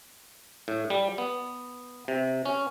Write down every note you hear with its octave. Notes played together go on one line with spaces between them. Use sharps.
A2
G3
B3
C3
C#4